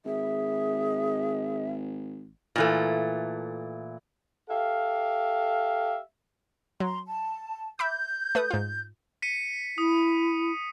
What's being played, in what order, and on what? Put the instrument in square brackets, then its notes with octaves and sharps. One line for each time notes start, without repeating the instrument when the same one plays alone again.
[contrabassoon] G#1 [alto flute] G#4 [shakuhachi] E5
[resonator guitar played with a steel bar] A#2 E3 A3
[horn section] G4 A4 E5 F5
[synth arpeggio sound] F#3 [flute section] A#5 C6
[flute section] A5
[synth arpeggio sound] E5 B5 D6 [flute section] G6
[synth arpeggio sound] A3 B4 D#6
G#2 F4
[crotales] B6 C#7 D#7
[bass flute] E4 [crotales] D#6